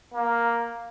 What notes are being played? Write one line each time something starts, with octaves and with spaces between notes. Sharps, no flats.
A#3